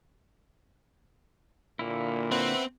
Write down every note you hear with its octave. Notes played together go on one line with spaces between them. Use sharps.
A#2 D3 A#3 E4
C4 B4 E5 F#5